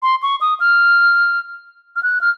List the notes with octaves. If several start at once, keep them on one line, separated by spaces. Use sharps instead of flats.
C6
C#6
D#6
F6
F6
F#6
F6